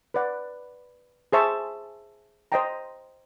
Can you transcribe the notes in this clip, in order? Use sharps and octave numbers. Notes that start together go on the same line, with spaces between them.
B4 D5 F#5
G#4 C5 E5 A5 C#6
C5 D#5 G5 A#5